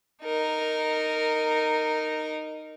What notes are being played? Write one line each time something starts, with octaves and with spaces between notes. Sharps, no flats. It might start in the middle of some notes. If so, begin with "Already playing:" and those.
D#4 A#4